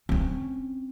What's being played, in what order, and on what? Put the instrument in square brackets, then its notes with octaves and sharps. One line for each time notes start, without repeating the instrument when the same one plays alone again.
[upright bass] C4 C#4